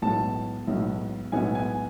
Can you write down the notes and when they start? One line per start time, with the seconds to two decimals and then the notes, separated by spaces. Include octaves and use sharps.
0.02 B1 A2 G#3 B3 A5
0.67 B1 A2 G#3 B3
1.32 B1 A2 G#3 B3 G#5
1.55 G#5